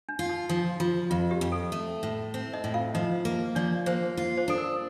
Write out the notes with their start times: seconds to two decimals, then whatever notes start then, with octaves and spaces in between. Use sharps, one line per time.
0.09 D4
0.19 F4
0.29 D#4
0.49 F3 D#4
0.80 F3 F4
1.10 F2 F4
1.31 G4
1.41 F2
1.52 A4
1.72 A3
2.03 A2
2.34 C4
2.53 D#4 D#5
2.64 A2
2.74 F4 F5
2.94 F3 D#4 D#5
3.25 A#3
3.55 F3 D4 D5
3.86 A#3 C5
4.17 F4
4.37 C5
4.48 D4 A4
4.58 A#4